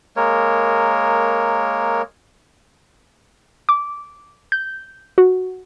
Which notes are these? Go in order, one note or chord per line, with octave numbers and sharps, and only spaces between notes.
G#3 A#3 A#4 C#5
D6
G6
F#4